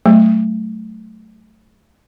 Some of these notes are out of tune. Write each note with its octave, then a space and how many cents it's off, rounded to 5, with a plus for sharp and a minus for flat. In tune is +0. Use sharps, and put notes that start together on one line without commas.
F#3 +25 A3 +0